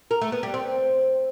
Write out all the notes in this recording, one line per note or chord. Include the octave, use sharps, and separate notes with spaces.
A#4
A3
B3
G3
C4